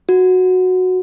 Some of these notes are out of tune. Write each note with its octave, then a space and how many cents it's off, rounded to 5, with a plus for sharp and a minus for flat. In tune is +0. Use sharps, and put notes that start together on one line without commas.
F#4 -5